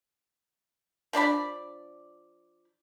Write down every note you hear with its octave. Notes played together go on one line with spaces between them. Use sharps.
F3 D4 D5 B5